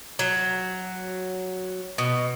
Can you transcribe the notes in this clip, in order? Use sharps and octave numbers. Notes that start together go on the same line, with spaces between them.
F#3
B2